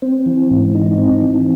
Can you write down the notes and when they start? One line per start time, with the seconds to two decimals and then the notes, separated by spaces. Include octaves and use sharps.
0.02 C4
0.26 E3
0.51 G#2
0.75 D#4
0.98 C4
1.22 E3